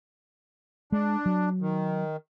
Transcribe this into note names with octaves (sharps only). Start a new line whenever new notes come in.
G#3 D4
F#3
D#3